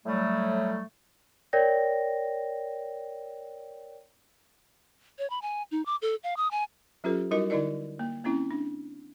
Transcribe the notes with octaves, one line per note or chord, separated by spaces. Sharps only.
A2 F#3 G3 A3
A#4 C#5 D5 G5 A#6
C#5
B5
G#5
D#4
D6
A4
F5
D#6
G#5
F#3 C#4 F4 G4 A4 B4
G3 D#4 E4 F#4 A#4 D#5
D3 D#4 E4 A#4 D5 D#5
A#3
A#3 C4 C#4 E4
D4